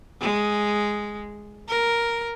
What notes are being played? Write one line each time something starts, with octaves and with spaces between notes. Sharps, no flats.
G#3
A#4